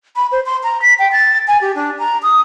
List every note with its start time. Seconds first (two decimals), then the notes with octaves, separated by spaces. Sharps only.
0.16 B5
0.32 C5
0.46 C6
0.63 A#5
0.82 B6
0.99 G5
1.12 A6
1.48 G#5
1.61 G4
1.75 D4
1.99 A#5
2.23 D#6